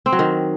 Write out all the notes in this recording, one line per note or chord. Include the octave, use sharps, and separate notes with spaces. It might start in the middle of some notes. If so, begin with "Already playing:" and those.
C4
F#3
D#3